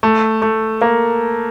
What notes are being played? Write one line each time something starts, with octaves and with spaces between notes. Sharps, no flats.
A3
A3
A#3